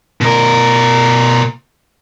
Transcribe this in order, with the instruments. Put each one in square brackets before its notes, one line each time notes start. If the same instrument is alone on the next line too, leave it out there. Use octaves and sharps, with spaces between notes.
[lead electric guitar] B2 A#4